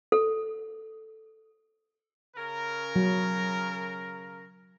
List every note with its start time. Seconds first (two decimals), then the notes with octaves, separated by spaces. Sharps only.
0.12 A4
2.36 C#3 A#4
2.96 F#3